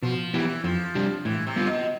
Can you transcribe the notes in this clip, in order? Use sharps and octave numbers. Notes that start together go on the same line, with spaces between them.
B2 F3
E3 B3 E4 G4
F2 F3
C3 G3 D4 G4
A2 E3
C3
G3 B3 F4
B2